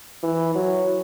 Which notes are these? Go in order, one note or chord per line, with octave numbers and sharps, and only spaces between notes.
E3
F#3